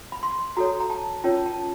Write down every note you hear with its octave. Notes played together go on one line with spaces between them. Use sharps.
B5
C6
F#4 A4 C#5 A#5
A#5
A5
C#4 F4 A#4 C#5 A5
A5